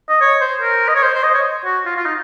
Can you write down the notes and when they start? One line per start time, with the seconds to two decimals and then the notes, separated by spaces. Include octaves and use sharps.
0.09 D#5
0.21 C#5
0.41 C5
0.61 A#4
0.89 D#5
0.96 C#5
1.03 C5
1.14 C5
1.24 D#5
1.34 C#5
1.65 F#4
1.86 F4
1.96 F4
2.05 D#4